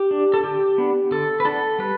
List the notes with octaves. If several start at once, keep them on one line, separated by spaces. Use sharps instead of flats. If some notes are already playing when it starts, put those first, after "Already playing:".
Already playing: G4
D4
A4
D3 G4
B3 D4
D3 A4
B4
B3 D4 A4
G3 B4